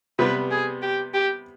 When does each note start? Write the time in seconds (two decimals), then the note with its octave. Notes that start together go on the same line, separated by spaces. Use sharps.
0.19 C3 G3 B3 B4
0.51 G#4
0.82 G4
1.14 G4